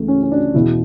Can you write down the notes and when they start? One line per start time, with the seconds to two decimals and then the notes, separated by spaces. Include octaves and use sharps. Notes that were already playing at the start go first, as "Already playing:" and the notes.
Already playing: C#2 C#3 E3 A3
0.08 C#4
0.23 C#4
0.32 D4
0.54 E2 B2 E4